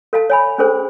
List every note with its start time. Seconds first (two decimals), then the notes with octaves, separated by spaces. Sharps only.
0.13 A4 F5 A5
0.30 C#5 G#5 B5
0.58 C#4 D4 G#4 A4 C5